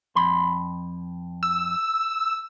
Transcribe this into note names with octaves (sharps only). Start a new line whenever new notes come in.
F2 B5 C6
E6